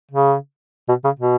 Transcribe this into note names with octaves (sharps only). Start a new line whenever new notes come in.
C#3
B2
C#3
B2